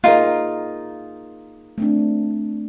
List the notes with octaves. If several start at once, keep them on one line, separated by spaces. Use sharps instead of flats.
A#3 D#4 F4 G#4 A#4
A3 C4 D4